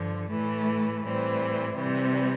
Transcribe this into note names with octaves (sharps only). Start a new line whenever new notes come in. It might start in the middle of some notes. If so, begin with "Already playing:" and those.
Already playing: G2 D3 F3
A2 E3 A3
A2 E3 G3 C4
C3 E3 G3